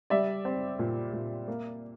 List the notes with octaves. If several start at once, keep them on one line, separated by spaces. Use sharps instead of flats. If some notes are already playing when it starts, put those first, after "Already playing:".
G3 D5 E5
C4
A#2
A#2
A#3